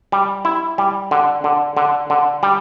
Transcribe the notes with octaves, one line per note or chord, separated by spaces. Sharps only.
G3
E4
G3
D3
D3
D3
D3
G3